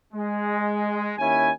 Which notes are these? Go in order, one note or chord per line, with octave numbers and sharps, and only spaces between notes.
G#3
D#2 C#4 E4 G#5